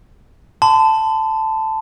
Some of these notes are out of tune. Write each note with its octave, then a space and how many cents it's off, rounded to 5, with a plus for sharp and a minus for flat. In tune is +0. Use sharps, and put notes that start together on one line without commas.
A5 +0 C6 -40